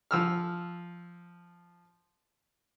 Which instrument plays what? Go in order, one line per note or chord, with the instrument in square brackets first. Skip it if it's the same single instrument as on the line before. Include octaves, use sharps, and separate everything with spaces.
[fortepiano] F3 E6 F6